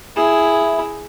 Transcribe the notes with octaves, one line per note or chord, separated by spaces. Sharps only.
E4 G#4 E5